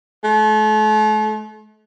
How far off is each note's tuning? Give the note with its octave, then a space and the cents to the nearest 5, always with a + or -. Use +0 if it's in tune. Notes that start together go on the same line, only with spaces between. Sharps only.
A3 -40